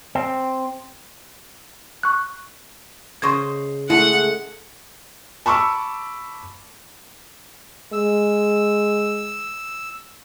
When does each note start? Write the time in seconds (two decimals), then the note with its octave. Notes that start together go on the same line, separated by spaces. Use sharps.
0.15 C4
2.03 C#6 F#6
3.22 C#3 C5 D#5 C6 C#6 G#6
3.90 G#3 A3 E4 F#5
5.46 A5 B5 C#6 D6 E6
7.93 G#3 E6